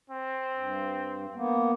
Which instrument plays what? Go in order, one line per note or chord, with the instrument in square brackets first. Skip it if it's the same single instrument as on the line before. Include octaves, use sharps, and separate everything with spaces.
[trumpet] C4
[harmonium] G2
A#3 B3